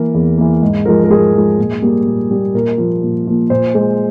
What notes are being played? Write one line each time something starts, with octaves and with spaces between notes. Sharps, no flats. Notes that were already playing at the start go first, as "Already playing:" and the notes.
Already playing: E3 A#3 A#4
E2
E3 A#3
G#2
F3 G#3 A#4
A#4
G#2 G#4
F3 G#3
A#2
G3 A#3
A#2
G3 A#3
A#2 A#4
F3 A#3
A#2
F3 A#3
A#2 C5
G#3